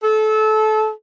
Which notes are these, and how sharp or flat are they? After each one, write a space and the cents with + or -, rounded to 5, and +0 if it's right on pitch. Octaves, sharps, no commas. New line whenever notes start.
A4 -25